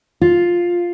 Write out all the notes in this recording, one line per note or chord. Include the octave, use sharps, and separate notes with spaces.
F4